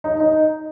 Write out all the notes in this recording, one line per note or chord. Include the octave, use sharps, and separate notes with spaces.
D#4
D#4